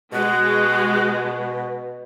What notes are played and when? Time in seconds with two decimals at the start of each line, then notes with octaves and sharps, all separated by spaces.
0.13 B2 G#3 F#4